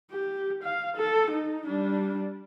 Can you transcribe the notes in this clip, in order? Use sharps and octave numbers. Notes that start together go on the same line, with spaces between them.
G4
F5
A4
D#4
G3 D4